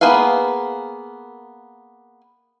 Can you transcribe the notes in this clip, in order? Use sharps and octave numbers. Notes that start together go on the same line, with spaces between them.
A#3 B3 G#4 B4 F5